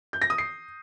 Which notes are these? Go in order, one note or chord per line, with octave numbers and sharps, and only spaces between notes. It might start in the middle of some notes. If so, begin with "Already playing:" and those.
G6
A#6
D#6
C7